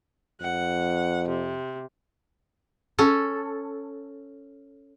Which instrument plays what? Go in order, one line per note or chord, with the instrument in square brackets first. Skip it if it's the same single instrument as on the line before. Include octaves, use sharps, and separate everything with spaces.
[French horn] F2 [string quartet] F#5
[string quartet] C3
[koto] C#4 A4